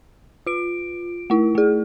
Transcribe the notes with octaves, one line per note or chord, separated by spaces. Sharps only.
F4 D7
A3 E4
A3 G#4